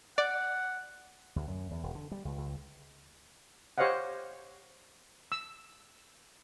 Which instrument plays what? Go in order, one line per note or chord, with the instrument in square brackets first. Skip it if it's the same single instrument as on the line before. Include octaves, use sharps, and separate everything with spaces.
[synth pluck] D5 [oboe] F#5
[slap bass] D2
F#2
E2
E1
D3
G3
C#2
C#2
[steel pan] G4 C5 C#5 D#5 F5 F#5
E6